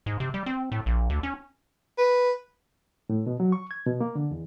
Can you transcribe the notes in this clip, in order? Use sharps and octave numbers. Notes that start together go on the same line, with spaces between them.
G#2
C3
G3
C4
A2
A#1
D2
C#4
B4
A2
B2
F#3
C#6
G#6
B2
A#3
D3
E2